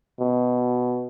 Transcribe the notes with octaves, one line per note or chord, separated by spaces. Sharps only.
B2